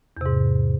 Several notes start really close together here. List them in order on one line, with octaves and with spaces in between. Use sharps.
E2 C3 G#2